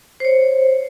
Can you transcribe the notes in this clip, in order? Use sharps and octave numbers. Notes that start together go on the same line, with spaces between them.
C5 C#5